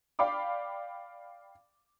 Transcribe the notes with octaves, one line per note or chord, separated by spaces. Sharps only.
D5 F5 G5 B5 D6